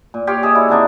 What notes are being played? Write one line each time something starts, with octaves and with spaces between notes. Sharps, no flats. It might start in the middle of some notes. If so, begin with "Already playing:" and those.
A#2
G4 C#5 F5 C6
G#4 C#5 D#5 E5
E4 F#4 D5
D3 C4 D4 D#4